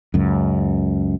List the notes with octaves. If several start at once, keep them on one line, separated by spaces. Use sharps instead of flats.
C#2 F#2